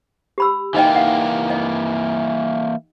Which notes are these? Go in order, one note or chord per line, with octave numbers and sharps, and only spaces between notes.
G4 B5 E6
E3 A#3 D#4 D#5 G5
F5 F#5
D#5